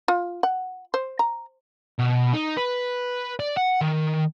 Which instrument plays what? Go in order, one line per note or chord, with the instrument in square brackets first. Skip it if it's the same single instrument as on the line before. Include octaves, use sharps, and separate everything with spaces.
[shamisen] F4
F#5
C5
A#5
[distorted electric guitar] B2
D#4
B4
D5
F#5
D#3